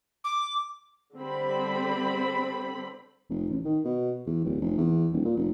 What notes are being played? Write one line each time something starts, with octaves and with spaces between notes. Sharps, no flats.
D6
D3 G3 C4 A4 C5 B5
F1
A1
D#3
B2
E2
D1
F1
E2
D#1
A#2
F1